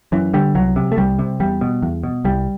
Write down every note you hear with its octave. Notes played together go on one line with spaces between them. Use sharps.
F#2 E3
D3 G3
C2 F#3
C3
A3
C2 G3
C3
E2 G3
B2
E2
B2
C2 G3